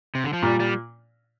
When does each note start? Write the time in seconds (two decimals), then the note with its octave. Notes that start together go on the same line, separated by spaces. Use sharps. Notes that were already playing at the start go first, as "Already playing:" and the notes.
0.15 C3
0.24 D3
0.33 F3
0.42 A#2 G3
0.60 G3